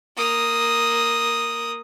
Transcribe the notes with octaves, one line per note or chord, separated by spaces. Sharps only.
A#3 D#6